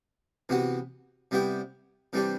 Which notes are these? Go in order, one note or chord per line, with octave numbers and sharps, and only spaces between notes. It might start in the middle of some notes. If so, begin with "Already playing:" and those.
C3 E3 B3 F#4
C3 G3 B3 E4 G4
C3 E3 G3 D4 G4